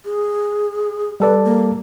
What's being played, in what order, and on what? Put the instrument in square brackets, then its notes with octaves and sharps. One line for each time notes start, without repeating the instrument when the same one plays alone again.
[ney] G#4
[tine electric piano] G3 A4 D5 [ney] B4
[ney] A#3